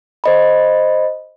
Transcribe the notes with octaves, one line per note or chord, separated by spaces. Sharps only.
C5 D#5 B5